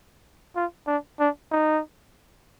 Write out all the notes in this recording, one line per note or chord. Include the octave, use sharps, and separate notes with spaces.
F4
D4
D4
D#4